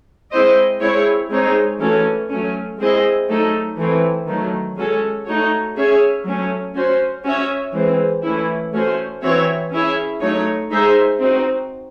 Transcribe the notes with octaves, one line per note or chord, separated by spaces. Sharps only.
G#3 C4 E4 C5 D#5
G#3 C4 E4 G#4 C#5
G#3 C4 D#4 G#4 C#5
E3 A3 C#4 F#4 A4
F#3 A3 C#4
G#3 C4 E4 G#4 D#5
F#3 A3 D#4 A4
E3 A3 C4
D#3 F#3 A3
G#3 C#4 F#4 A4
A3 D#4 F#4 C#5
C#4 G#4 C#5 E5
F#3 A3 C#4
C#4 F#4 C5
C#4 F#4 C#5 E5
E3 G#3 C4
E3 A3 C#4 E4
A3 C#4 F#4 C5
E3 C4 F#4 C#5 E5
C#4 E4 G#4 C#5 E5
F#3 A3 D#4 F#4 C#5
G#3 D#4 G#4 C5 E5
C4 D#4 F#4